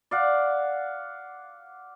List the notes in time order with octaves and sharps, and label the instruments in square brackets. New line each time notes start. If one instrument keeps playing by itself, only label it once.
[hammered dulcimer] D5 F5 F#5